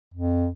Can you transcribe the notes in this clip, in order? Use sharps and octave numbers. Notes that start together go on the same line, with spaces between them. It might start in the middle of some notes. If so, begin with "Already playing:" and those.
F2